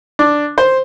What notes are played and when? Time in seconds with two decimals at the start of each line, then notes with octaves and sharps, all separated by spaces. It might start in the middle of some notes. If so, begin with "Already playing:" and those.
0.19 D4
0.58 C5